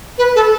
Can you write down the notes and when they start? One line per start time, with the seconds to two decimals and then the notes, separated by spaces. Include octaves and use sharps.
0.18 B4
0.36 A4